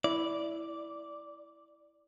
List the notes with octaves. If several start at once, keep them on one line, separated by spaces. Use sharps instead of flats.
E4 D5